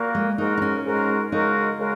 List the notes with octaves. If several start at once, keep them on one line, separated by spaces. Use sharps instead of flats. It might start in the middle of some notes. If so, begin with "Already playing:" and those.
Already playing: A#2 A#3 F#4 A#4
G#3
G#2 G#3 D#4 F#4 A#4
D#4
C#4
G#2 G#3 F#4 A#4
C#3 G#3 D#4 F#4 A#4
C#3 G#3 F#4 A#4